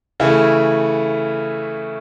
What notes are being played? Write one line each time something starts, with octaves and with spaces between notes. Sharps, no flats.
C#3 E3 A3 E4